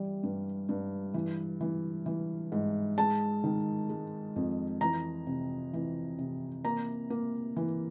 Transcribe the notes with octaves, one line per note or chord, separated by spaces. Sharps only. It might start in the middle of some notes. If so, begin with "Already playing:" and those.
Already playing: E3 G3
G2
G2
E3
E3
E3
G#2
G#3 A5
D#3
G#3
F2
E3 A#5
C3
E3
C3
A#3 A#5
A#3
E3